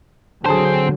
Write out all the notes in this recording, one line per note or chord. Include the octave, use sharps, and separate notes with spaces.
D3 F#3 C4 G#4 C5 A5